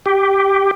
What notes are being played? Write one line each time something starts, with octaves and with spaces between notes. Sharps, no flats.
G4